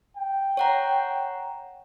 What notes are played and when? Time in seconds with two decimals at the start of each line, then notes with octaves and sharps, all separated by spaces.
0.17 G5
0.57 C#5 F#5 A#5